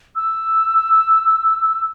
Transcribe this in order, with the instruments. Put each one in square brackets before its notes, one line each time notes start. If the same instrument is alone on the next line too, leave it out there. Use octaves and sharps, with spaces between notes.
[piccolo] E6